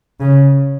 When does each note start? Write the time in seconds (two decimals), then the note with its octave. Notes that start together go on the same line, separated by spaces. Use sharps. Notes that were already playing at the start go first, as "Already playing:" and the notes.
0.20 C#3